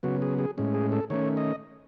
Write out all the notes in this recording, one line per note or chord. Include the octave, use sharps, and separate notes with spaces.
C#3 F#3 B3 F#4
G#4
G#4
A2 G#3 C#4
G#4
A4
D#3 A3 C#4 C#5
D#5